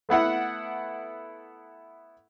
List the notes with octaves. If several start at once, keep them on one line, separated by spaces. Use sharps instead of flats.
A3 B3 E4 F#5